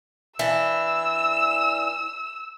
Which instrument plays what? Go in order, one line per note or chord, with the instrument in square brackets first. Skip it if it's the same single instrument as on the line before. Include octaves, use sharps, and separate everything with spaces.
[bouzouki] E3 D4 [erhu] E6